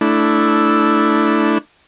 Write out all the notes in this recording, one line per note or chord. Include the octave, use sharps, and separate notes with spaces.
A3 D4 E4